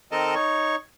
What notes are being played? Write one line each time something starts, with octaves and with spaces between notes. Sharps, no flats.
D#3 C4 A4 A#4 D#5 A5
D#4 C#5 C#6